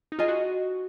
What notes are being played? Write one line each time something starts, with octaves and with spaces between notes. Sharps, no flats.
D#4
F4 G#4 D#5 G#5
F#4